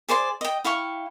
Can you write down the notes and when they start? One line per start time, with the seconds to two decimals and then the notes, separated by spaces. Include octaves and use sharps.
0.09 G#4 C5 D5 C6
0.41 D#5 G5
0.64 E4 F5 G5 C#6